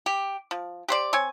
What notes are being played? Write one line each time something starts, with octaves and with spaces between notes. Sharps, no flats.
G4
F3
G4 C5 D5
C4 C#5 G#5